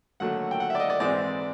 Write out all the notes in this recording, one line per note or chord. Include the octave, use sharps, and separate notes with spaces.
D#2 D3 F#3 A3 F#5
G5
F#5
D5 E5
D#5
D5
G#2 E3 G#3 C4 D5